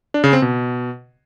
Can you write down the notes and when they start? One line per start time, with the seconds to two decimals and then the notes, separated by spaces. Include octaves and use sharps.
0.14 D4
0.24 C#3
0.33 C4
0.42 B2